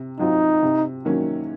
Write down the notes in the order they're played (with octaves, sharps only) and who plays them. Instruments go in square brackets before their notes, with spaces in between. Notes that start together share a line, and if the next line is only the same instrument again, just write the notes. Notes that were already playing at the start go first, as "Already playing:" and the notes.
Already playing: [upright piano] C3
[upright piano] F#3 C4 F4 [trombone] D#4
[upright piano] C3
D#3 F#3 A#3 C#4